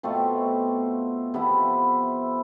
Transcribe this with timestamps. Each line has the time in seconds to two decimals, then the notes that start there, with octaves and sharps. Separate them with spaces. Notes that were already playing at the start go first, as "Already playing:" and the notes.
0.03 B2 A3 C4 F4
1.34 C3 F3 B3 E4